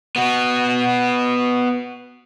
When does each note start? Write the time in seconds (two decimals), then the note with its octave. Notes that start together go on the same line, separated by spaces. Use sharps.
0.16 B3 F#4